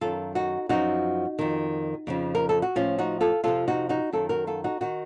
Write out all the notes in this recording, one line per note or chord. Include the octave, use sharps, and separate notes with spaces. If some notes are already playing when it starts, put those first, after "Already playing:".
F#2 D#3 F4 A4
D#4 F#4
F#2 F3 D#4 F#4
F2 D#3
F2 C#3 F3
A#4
A4
F#4
A2 F3 C#4 F4
D#4 F#4
F4 A4
F2 C3 F3 F4 A4
D#4 F#4
D#4 F#4
F#2 D#3 F4 A4
F#4 A#4
F4 A4
D#4 F#4
D#3 D#4 F#4